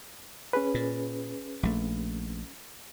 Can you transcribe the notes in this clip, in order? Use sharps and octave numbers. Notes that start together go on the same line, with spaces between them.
C#4 G#4 B4
A#2
A#1 A3